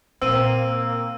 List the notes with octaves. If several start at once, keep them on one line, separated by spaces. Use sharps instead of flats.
A#2 D3 A#3 C4 E6 D#7